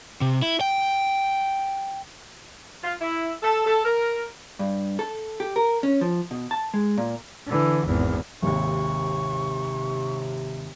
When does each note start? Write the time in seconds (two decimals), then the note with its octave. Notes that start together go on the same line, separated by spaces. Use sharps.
0.21 C3
0.42 E4
0.61 G5
2.84 F4
3.01 E4
3.43 A4
3.66 A4
3.85 A#4
4.59 G2
4.99 A4
5.40 G4
5.56 A#4
5.83 C#4
6.01 F3
6.31 B2
6.51 A5
6.74 G#3
6.98 A#2
7.47 D3 E3
7.85 G#1 E2
8.43 G#1 D#2 C3 C#6